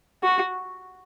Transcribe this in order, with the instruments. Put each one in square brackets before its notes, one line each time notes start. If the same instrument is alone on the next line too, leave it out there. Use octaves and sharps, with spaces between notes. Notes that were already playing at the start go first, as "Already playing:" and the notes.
[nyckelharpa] F#4